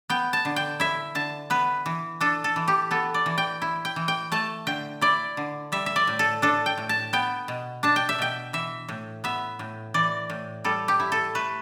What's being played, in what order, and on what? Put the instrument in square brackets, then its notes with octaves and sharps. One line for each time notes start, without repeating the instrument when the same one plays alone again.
[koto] B3 G5
A5
D3
G5
E4 E5
D3 A5
B3 B4
E3
D4 A4
A4
E3
G4
B3 A4
D5
E3
G5
E4
G5
E3
G5
A3 A5
D3 G5
E4 D5
D3
G3 E5
E5
D5
A2
A4
D4 A4
G5
A2
A5
B3 G5
B2
D4 A5
G5
E5
B2 G5
E3 E5
A2
B3 E5
A2
E3 D5
A2
G3 A4
G4
E4
A4
A3 B4